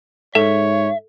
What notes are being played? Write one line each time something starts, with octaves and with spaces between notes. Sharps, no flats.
G#2 A4 C#5 E5